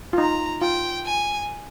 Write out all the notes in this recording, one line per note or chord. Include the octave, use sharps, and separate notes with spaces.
F4
D#4 A#5
F4 G5
G#5